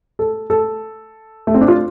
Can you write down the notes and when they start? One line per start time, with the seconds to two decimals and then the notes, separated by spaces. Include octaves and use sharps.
0.19 A4
0.50 A4
1.47 A3
1.54 C4
1.61 D4
1.68 F4